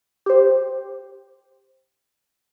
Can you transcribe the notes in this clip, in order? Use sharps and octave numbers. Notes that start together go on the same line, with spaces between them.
G4 C5